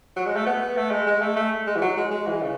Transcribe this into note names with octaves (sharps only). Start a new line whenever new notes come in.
F#3
G#3
A3
B3
A3
G#3
G#3
A3
A3
G#3
E3
F#3
G#3
G#3
E3
C#3